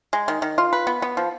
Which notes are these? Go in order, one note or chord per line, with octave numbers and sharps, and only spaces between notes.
G#3
D#3
D#3
F4
B4
B3
B3
F3